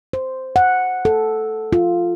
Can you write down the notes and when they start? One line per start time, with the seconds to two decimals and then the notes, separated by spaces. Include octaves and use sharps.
0.13 C5
0.56 F#5
1.05 A4
1.73 F4